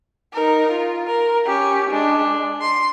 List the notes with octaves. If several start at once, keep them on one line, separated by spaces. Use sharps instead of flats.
D#4 A#4
F4
A#4
C#4 G4
G#3 D4
C6